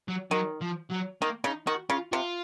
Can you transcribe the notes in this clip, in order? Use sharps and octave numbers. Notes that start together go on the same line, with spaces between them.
F#3
D#3 F#3
F3
F#3
D#3 A#3
C#3 D#4
D#3 F#4
C#3 F4
C3 F4